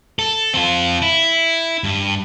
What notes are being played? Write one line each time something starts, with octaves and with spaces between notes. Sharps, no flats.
A4
C4 F4
E4
G2